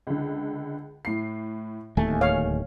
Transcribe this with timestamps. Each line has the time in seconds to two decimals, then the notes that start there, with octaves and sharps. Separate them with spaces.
0.07 C#2 D3
1.05 A2 C7
1.97 D1 D#2 A3 G#5
2.21 C#5 F5